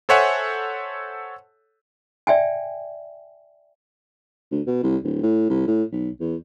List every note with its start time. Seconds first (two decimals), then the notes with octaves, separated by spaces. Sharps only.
0.09 A4 C5 C#5 E5 F#5 G#5
2.27 D5 E5 G5 G#5
4.51 D2
4.67 B2
4.83 C2
5.04 D1
5.23 A2
5.50 C2
5.67 A2
5.92 B1
6.20 E2